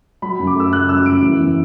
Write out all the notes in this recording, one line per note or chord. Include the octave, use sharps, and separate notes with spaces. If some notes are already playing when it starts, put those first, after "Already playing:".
F#3 B5
F#2
D6
A3 E6
C#3 F#6
F#3 E6
F#2 D7
E3
E2